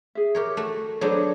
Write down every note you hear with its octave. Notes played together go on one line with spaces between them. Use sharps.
G#4 E5
G4 A#4 C#5
A3 F#4
F#3 B3 D4 A4 C5 C#5